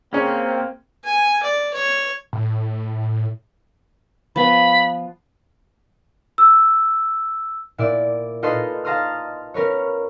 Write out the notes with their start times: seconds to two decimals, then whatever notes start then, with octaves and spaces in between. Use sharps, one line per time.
0.13 C#3 A#3 C4 C#4 G5 A#5
1.04 G#5
1.42 D5
1.73 C#5
2.33 A2
4.36 F3 B3 B5
6.38 E6
7.78 A#2 E4 D5
8.43 D#4 F4 A4 B4 D#5 C6
8.85 F5 A5 A#5 C6 D#6 F6
9.54 C#4 A#4 B4 C#5